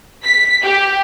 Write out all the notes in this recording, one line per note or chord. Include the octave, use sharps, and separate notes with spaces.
B6
G4